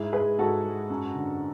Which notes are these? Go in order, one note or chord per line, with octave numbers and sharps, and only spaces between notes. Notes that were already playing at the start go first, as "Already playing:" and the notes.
Already playing: G#2 E4 G#4
G#3 G#4 B4
G#2 F#4 A4
G#3
F#2
D3